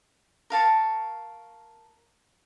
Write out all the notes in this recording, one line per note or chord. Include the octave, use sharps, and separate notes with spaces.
A#4 F5 A5 C#6